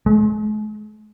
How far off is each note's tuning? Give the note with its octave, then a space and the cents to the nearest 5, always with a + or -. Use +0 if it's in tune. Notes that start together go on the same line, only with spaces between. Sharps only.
G#3 +45